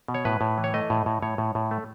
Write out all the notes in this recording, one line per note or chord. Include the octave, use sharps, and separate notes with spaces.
B2
C#5
A2 B4
A2
E3
C#5
A3 D#5
A2
A2
A2 C#5
A2
A2
A3